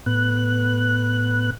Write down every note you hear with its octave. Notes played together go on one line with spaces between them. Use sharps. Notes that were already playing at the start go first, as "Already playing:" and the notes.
A2 B3 F#6